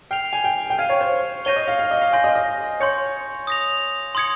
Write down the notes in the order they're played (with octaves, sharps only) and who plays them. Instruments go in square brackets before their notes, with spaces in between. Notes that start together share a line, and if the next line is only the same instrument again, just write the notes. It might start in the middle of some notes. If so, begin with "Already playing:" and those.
[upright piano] G5 [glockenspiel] F6 C7 F7
[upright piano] G#5
G5
G5
[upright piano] F5 [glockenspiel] F6 G#6 C7 D#7
[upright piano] C#5
C5
[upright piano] C#5 [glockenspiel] G6 A#6 D#7 G7
[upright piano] D#5
F5
F5
D#5
F5
[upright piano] F5 [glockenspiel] G#5 C6 G6 A#6
[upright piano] D#5
D#5
[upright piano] C#5 [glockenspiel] C6 G6 C#7
[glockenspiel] D#6 A#6 F7
C6 D#6 G#6 C#7